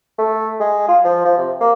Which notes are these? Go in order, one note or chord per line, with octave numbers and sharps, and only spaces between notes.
A3
G#3
F4
F3
F3
C3
A#3